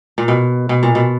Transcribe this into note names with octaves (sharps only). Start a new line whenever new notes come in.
A#2
B2
B2
A#2
B2